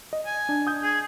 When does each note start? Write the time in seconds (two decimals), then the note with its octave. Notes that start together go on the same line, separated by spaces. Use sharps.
0.13 D#5
0.26 G#5
0.49 D4
0.67 D#6 G6
0.83 G#4